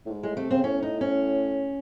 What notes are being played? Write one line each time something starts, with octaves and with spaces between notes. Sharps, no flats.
A2
G#2
A2 G#3
C3 A3
C#3 C4
A2 C#4
D#4
C#4